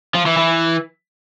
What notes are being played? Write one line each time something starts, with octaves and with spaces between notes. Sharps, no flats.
F3
E3
E3